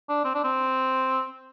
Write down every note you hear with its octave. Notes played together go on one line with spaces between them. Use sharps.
D4
C4
D4
C4